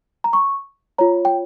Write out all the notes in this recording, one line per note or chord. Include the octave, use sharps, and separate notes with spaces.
A#5
C#6
F4 C#5 A#5
G5